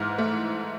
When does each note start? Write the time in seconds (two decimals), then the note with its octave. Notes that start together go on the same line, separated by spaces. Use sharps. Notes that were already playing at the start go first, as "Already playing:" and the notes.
Already playing: G#2 E3 F6
0.18 A3